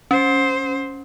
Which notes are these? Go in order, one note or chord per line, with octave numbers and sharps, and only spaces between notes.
C#4 C5